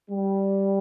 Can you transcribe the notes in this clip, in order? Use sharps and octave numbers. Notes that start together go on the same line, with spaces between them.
G3